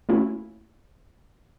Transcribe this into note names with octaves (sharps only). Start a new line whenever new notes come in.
A3 A#3 C#4 E4 F#4